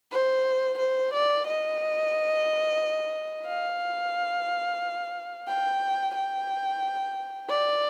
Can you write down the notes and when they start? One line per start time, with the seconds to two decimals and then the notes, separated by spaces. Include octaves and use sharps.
0.12 C5
0.79 C5
1.13 D5
1.47 D#5
3.47 F5
5.48 G5
6.15 G5
7.50 D5